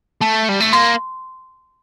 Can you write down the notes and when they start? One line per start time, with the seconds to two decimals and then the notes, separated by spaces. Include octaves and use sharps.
0.21 A3 A5
0.49 G3
0.60 A3
0.73 A#3 C6